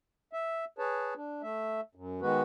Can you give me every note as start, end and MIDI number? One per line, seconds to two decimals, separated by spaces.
0.33 0.65 76
0.79 1.14 68
0.79 1.14 71
0.79 1.14 73
0.79 1.14 81
1.16 1.42 62
1.42 1.81 57
1.42 1.81 76
1.95 2.21 42
2.22 2.42 51
2.22 2.42 56
2.22 2.42 59
2.22 2.42 66
2.22 2.42 71